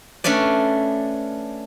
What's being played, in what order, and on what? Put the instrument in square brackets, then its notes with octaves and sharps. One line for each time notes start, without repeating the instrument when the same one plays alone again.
[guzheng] A3 C#4 D4 B4 D5